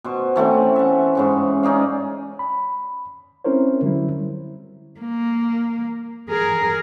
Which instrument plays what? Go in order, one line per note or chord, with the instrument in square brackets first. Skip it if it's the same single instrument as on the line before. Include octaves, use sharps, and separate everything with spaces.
[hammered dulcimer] B2 C5 C#6
E3 A3 C4 C#4
E5 F#5
G#2 C#3 C#6
C#4 D#4 D5 F5
[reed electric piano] B5
C4 C#4 E4 A#4 C5 C#5
D3 F#3 G3 E4
[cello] A#3
G#4 A#4